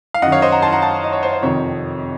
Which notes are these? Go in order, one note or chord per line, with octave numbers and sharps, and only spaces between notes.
F5
F#2 D#3 D#5 F#5
C#5 F5
C5 D#5
F#5 A#5
A5 C6
F#5 A#5
F5 A5
D#5
C#5
C5
C5
F2 C3 D#3 C#5